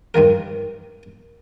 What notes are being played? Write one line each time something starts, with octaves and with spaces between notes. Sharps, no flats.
G2 D#3 F3 A#4